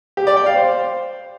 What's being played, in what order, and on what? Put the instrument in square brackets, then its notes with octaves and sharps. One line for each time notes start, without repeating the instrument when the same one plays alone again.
[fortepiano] G4
D5
G5
F5
C5